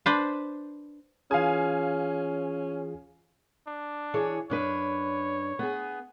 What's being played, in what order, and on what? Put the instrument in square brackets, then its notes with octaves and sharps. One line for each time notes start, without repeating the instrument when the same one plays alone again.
[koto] D4 B4 C5
[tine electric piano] E3 F4 G#4 [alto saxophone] C#4 [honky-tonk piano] F5 G#5
[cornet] D4
[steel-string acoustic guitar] E3 G#4 C#5
[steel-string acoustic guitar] F#2 D4 B4 [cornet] C#5
[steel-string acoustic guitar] B3 G#4